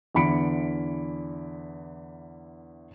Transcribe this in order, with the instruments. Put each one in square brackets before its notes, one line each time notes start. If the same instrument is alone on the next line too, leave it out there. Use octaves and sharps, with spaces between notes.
[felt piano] E2 D3 E3 B5 C#7 D7